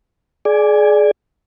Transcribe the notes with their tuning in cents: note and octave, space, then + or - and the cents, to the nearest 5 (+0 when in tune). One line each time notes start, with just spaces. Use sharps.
G#4 +25 D5 +0 G#5 -20